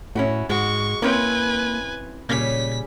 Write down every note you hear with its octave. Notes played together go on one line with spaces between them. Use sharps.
A2 C#4 E4 F#4
G#2 G#3 F#4 C#6
A#3 C4 C#4 E4 B4 G#5
A#2 C#3 G3 C#4 B6